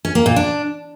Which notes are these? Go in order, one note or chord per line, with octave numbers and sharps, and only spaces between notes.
C#4
A#3
A#2
D4